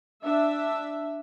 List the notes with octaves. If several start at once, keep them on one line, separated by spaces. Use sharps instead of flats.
D4 E5